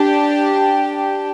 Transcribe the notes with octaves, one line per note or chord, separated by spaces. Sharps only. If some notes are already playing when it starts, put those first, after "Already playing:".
Already playing: D4 G4